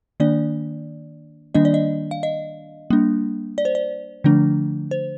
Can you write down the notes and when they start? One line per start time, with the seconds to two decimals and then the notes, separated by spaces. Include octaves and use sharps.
0.20 D#3 A#3 D4 D5
1.55 D#3 G3 A#3 D4 D#5
1.65 D5
1.74 D#5
2.11 F5
2.23 D#5
2.90 G3 A#3 D4
3.58 D5
3.65 C5
3.75 D5
4.24 D3 F3 A3 D4
4.91 C5